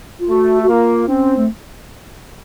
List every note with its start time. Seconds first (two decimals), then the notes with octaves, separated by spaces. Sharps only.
0.20 F4
0.30 A3 F#4
0.62 F#4
0.69 A#3 F4
1.08 C4 C#4
1.36 A3